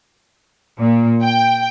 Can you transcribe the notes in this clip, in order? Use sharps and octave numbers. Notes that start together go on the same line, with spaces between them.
A#2
G5